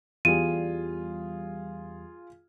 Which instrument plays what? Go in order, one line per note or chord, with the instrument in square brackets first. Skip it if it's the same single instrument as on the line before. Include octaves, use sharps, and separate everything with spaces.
[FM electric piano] E2 G3 [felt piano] F4 G#4 [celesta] D#7